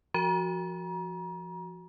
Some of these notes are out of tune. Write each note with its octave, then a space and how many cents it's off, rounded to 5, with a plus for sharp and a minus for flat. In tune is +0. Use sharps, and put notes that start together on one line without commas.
F3 -25 F#4 +0 A#5 +35